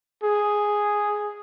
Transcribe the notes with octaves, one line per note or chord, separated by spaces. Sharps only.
G#4